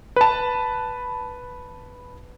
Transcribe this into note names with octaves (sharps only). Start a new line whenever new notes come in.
B4 A5